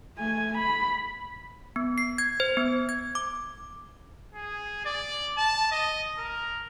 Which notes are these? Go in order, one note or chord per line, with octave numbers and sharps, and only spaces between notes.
A3 G#5
B5
B3
C7
G#6
C5
B3
G#6
D6
G#4
D5
A5
D#5
A#4